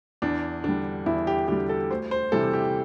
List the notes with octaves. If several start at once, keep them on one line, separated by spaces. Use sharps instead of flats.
E2 D4
D3 G3 D4
E2 E4
G4
D3 G3 G4
A4
D2 C5
C5
C3 E3 G3 A4
G4